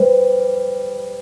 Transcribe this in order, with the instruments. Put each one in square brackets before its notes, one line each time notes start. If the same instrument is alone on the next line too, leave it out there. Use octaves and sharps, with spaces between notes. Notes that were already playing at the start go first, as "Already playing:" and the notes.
Already playing: [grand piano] G3 [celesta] B4 C5